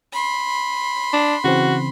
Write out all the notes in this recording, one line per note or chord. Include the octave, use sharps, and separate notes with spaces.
B5 C6
D4
C#3 E3 C4 F#4